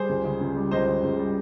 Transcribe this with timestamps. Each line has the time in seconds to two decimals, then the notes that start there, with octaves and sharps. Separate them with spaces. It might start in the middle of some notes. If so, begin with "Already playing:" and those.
Already playing: G3 G#4 C5
0.09 C#2
0.24 C#3
0.40 C#2
0.56 G3
0.71 C#2 C5 D#5
0.87 C#3
1.03 C#2
1.19 G3